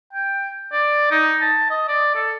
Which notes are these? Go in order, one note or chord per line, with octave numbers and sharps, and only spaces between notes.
G5
D5
D#4
A5
D#5
D5
A4